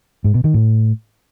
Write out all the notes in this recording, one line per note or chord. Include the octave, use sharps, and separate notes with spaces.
G#2
B2
D#3
A2